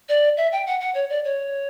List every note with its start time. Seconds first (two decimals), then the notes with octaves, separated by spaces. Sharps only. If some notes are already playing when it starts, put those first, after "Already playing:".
0.09 D5
0.37 E5
0.52 G5
0.67 F#5
0.80 F#5
0.94 C#5
1.10 D5
1.25 C#5